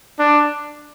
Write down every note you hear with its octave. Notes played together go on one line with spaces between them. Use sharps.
D4